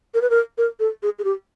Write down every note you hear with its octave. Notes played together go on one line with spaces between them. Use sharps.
A#4
B4
A#4
A#4
A4
G#4
G#4
G4